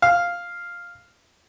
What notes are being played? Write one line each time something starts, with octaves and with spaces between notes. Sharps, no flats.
F5